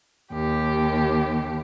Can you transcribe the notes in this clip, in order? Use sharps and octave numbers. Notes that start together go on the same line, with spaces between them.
D#2 G4